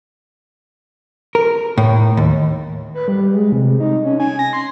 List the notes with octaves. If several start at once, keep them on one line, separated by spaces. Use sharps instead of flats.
A#4
A2
D#2
B4
G3
G#3
C3
D#4
C#4
G#5
A#6
C6